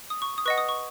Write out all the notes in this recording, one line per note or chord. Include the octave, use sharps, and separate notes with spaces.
D#6
C#6
D#6
B4 D#5 F#5 C#6
D#6
C#6